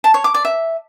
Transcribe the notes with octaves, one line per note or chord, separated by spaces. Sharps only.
A5
C#5
D6
D5
E5